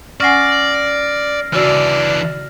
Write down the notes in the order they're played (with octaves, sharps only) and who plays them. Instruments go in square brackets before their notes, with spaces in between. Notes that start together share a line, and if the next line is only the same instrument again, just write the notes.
[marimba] C#4 F#5 G#5 [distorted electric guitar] D5 [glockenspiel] F6 A#6 C7
[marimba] C#3 F#4 E6 [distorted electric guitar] E3 D4 [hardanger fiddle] D5